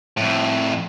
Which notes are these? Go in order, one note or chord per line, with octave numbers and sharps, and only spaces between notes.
F2 A2